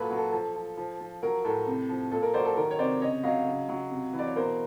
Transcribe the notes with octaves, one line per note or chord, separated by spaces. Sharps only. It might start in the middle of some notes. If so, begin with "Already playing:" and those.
Already playing: A#2 F#3 A4 B4
F#3
A4
F3 A4
F3
F3
F3
F#3 A#4
A2 A4
C3
F3
A#2 A4
A#4
F#3 C5 D5
A4
D#3 A#4
C#5
C3 C5 D5
C#3 C#5 D#5
F#3 D#5 F5
C#3
F#3
C3
E3
D5
C#5
B2 A#4 C5